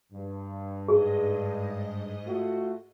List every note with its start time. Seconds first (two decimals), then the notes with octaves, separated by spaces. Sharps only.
0.13 G2
0.88 G#2 G#4 D#5
2.25 A3 F4 F#4